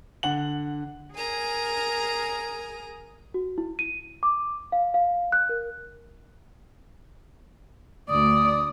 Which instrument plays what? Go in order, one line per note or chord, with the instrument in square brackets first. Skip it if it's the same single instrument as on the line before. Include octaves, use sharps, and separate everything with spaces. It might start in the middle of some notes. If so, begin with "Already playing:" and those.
[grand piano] D3 F#5 F#7
[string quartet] G#4 A#4 G#5 A#5
[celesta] F#4
E4
D#7
D6
F5
F5
F#6
A#4
[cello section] D2 [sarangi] D5 [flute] D#6